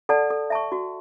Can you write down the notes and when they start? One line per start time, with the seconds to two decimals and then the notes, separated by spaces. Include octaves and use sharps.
0.09 A4 D5 F#5 A5
0.30 A4
0.50 E5 A5 C#6
0.72 F#4